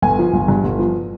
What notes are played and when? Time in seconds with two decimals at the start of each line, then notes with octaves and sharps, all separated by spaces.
0.02 G1 G#5
0.19 F3
0.33 G1
0.48 G2
0.64 G1
0.79 F3